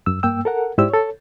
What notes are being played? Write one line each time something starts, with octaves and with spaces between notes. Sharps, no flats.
F#2 E6
G2 A#3 G5 E6
A4 A#4 F#5
G#2 E4 G4 C5 D5 E6
A4 C#5